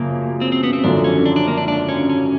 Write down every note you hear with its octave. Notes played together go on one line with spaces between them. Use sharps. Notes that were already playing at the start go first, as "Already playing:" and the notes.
Already playing: F#2 C#3 F3 A#3
C4
C4
B3
C4
G#1 F#2 D3 F3 D4
C#4
D4
D4
A#3
D4
D4
C#4
C#4